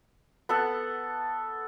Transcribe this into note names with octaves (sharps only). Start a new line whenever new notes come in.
B3 A4 F#5